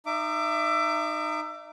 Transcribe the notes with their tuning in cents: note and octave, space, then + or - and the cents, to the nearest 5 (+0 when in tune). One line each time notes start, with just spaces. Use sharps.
D#4 -20 E5 +25 D6 +0